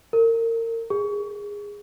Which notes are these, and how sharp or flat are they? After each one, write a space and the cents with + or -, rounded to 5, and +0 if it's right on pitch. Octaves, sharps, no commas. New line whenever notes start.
A#4 -30
G#4 -15